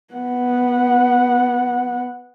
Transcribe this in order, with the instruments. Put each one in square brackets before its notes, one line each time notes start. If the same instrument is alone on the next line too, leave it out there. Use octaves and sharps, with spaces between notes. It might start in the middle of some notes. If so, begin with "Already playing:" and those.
[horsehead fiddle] B3 F#5